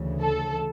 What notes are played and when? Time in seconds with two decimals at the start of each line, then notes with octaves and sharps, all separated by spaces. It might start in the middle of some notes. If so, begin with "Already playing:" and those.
Already playing: D2 C#3 E3
0.21 A4